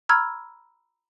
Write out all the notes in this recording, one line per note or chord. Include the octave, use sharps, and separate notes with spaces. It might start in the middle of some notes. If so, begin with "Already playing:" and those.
A#5 B5 C#6 E6 F6 G#6